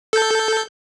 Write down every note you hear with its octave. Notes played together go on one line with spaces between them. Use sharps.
A4 G6